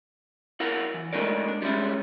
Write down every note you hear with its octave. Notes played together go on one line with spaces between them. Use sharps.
E4 A#4 F5 F#5
E3
G#3 A3 D4 D#4 A#4 D5
D4
G3 G#3 C#4 E4